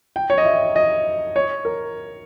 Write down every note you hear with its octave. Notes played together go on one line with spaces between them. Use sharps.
G5
C#5
D#5
E5
D#5
C#5
A#4